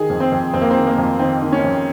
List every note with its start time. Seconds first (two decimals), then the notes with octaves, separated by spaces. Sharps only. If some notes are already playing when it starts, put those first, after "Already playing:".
Already playing: D#3 G#4
0.09 F2
0.20 C4
0.32 F2
0.53 F2 C4
0.61 A#3
0.71 C4
0.76 D#3
0.87 A#3
0.98 F2
1.20 D#3 C4
1.42 D#3
1.52 C#4
1.64 F2